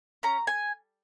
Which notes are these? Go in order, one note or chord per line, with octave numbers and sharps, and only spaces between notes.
C#4 A#5
G#5